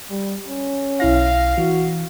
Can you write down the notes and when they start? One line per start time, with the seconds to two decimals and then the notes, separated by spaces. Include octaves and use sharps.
0.10 G3
0.48 C#4
1.00 B1 E4 F5 A#6
1.58 E3 F#4